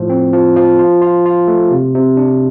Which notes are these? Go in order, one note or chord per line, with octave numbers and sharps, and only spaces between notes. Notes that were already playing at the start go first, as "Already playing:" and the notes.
Already playing: A2 F3
C4
F3
F3
F4
F4
F4
A3
C3
C3
D4